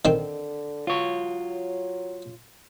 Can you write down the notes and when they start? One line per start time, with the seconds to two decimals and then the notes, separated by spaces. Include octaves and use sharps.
0.05 D3 D#3 C4
0.87 F#3 F4 C#5